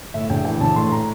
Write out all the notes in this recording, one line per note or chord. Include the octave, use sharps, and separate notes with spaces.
A2 E5
A#1 G5
E3 G5
A#1 A5
A2 C6
A#5